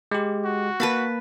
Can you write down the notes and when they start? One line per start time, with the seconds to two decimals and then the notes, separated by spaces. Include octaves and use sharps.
0.11 G#3 G4
0.45 F#4
0.80 A#3 B4 A5 B5